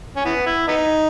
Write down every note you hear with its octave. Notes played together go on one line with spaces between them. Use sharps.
C#4
E3 B3
E4
B3 D#4